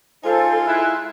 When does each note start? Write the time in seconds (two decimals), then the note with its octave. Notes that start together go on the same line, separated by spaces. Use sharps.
0.24 G#3 D#4 F4 A4 C5 G#5
0.67 E4 F#6